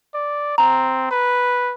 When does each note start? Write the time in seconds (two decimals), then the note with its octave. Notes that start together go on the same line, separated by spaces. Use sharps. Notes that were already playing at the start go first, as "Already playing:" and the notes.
0.14 D5
0.58 C4 A#5
1.11 B4